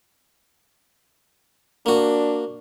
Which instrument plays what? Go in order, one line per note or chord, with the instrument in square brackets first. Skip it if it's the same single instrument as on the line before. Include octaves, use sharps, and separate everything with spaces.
[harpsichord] A#3 F#4 [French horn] D4